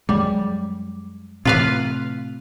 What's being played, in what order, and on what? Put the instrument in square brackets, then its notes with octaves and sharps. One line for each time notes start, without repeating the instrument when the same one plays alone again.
[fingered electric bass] F#2 G#3 [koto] G3
[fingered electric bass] A2 C3 [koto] F4 B4 F5